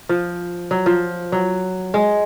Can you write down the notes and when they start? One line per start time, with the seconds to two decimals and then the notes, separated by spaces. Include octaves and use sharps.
0.09 F3
0.71 F#3
0.86 F3
1.32 F#3
1.94 G#3